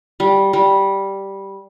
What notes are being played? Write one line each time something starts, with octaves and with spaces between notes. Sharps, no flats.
G3
G3